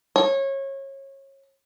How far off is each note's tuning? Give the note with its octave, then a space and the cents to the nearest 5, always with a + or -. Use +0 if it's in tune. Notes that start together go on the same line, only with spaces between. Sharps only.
C#5 -25